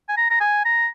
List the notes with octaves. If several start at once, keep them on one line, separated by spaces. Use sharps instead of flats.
G#5
A#5
A#5
G#5
A#5